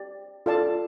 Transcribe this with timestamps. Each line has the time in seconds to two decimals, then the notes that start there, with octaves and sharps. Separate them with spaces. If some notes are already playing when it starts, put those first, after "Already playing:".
Already playing: G4 D5
0.46 F4 A4 D5 F5 A5